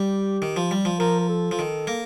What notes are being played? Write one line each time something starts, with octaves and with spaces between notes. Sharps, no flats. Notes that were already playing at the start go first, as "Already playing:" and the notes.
Already playing: G3 G4
D#3
F3
G3
F3
F3 A#4
A#4
A4
F3
D#3
A#3